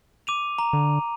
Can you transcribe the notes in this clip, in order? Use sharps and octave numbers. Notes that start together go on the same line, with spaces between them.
D6 D#7 F7
A#5
D3